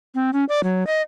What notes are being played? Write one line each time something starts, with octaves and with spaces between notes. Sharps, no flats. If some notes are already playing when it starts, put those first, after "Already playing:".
C4
C#4
D5
F#3
D#5